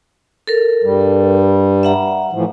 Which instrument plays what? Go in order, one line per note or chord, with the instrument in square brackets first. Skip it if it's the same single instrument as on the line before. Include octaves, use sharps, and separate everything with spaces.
[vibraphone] A4 A#4
[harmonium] G2 G3
[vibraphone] E5 F#5 A#5
[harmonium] A2 E3 F3